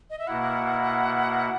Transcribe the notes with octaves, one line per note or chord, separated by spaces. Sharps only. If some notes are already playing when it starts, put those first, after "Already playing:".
D#5
E5
B2 A#3 E4 F#5